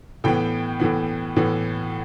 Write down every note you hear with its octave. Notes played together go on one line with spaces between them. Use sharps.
A2 E3 B3 G5
A2 E3 B3
A2 E3 B3